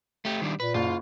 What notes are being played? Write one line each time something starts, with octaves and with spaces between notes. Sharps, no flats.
A3 G4
D#3 G3 D4
A#2 B4
F#1 F4